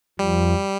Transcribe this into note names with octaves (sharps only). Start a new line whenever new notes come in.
F2 F3 G3